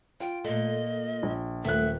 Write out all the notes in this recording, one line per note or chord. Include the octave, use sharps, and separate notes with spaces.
F4 G5
A#2 A3 D#5
A#1
D#1 F#3 A3 E5 F#6